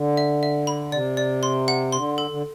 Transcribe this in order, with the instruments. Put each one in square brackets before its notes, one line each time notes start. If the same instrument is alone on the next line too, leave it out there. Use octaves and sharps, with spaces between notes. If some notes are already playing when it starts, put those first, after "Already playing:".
Already playing: [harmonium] D3
[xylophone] E5
E5
B5
[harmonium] C3 [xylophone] D5
[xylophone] D5
C6
F#5
[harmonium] D3 [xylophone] C6
[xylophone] A4
[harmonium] D3